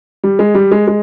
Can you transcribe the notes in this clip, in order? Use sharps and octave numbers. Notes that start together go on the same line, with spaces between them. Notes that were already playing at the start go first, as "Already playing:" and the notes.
G3
G#3
G3
G#3
G#3